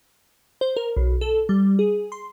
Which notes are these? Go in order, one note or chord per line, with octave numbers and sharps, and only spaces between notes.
C5
A#4
B1
A4
G3
G#4
C6